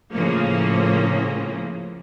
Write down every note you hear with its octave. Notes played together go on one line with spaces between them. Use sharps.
A2 C#3 F3 A#3